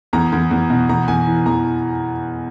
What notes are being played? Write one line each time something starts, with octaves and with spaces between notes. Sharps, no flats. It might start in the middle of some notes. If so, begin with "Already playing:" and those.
E2 A#5
E2
E2
B2
E2 A#5
E2 G#5
E3
E2 A#5